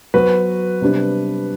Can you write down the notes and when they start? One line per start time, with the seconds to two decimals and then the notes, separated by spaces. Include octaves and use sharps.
0.14 F#3 B3 F#4 B4 C5
0.81 C3 G3 B3 D4